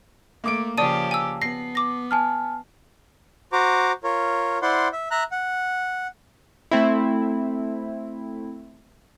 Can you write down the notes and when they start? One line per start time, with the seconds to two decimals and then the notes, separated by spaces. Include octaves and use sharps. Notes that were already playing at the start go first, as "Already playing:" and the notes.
0.44 A3 A#3 D6 D7
0.78 C#3 F3 G4 D5 A5 D#6 D#7
1.11 G#5 E6
1.42 B3 A#6 C7
1.75 D6 A#6
2.11 G#5 A5 F6
3.53 F#4 C5 A#5 D6
4.04 F4 A#4 C#5
4.62 E4 C5 D5 F#5 C6
4.93 E5
5.11 E5 A#5 F#6
5.32 F#5
6.71 A3 C4 E4